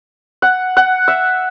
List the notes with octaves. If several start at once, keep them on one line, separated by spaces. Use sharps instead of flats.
F#5
F#5
E5